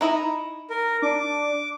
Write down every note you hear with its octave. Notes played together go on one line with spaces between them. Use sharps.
D#4 E4 D#5
A#4
D4 D6